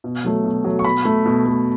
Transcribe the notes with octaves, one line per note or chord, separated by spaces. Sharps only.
B2
F#3 A3
B2
F#3 A3
C#6
B2 B5
A3
B2
A3